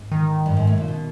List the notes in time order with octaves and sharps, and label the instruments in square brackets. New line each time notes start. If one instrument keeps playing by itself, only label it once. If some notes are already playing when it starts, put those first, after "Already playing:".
Already playing: [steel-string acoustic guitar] G#2
[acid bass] D#3
[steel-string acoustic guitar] G2
G#2
A2
A#2
B2